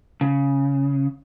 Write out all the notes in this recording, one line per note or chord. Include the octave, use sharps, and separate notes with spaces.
C#3